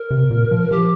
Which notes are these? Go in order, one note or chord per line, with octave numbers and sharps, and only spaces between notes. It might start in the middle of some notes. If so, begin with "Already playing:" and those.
Already playing: A#4
C3
A#2
F3
F3 G4